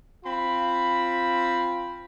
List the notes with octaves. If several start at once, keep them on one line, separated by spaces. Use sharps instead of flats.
C4 F4 B5